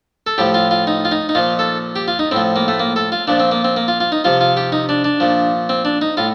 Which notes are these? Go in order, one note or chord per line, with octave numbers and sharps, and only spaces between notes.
A4
A2 F3 G4
F4
F4
D#4
F4
D#4
D#4
A#2 F3 F4
A4
G4
F4
D#4
A2 F3 C4
A#3
A3
A#3
A4
F4
A#2 F3 D4
C4
A#3
C4
A#3
F4
F4
D#4
C3 F3 F4
F4
G4
D#4
D4
D4
A#2 F3
C4
D4
D#4
A2 F4